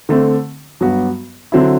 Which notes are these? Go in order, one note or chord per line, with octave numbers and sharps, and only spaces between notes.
D3 A3 C4
G2 F#3 B3 F#4
D3 F#3 C4 E4